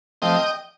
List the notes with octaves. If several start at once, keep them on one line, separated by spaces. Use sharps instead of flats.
F3 A3 C4 D#5 G5